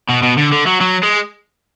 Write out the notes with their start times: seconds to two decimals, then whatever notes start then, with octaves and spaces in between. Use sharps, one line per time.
0.09 B2
0.22 B2
0.37 D3
0.52 D3
0.66 F#3
0.81 F#3
1.03 G#3